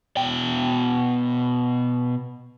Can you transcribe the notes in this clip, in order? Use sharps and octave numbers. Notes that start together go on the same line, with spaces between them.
B2 G5